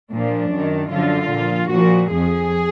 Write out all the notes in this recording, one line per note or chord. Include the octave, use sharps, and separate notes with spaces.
A#2 F3 D4
F#2 D#3
F#2 D3 F3 F4
A#2 F3
A#2 F3 F#4
F2 F3 G#4